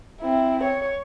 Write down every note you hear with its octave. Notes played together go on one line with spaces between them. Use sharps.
C4 E4
C#5